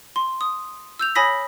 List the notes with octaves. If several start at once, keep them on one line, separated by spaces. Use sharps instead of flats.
C6
D#6
E6 G6 F7
C#5 G#5 B5 D#6 A#6 B6